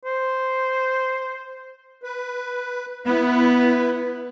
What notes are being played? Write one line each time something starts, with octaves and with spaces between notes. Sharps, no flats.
C5
B4
B3 E4 B4